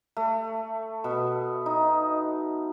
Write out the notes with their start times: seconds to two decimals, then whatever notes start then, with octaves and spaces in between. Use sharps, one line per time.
0.17 A3
1.04 B2
1.66 D#4